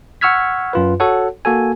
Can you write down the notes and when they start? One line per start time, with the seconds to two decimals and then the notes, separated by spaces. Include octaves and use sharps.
0.21 F#5 C#6 E6 F6 G#6 B6
0.73 F#2 F4 B4
1.00 F#4 A4 C#5 F#5
1.45 A#3 F#4 A4 G#5